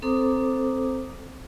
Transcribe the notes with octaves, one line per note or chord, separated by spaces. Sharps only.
C4 A4 C5 A#5 D6 D#6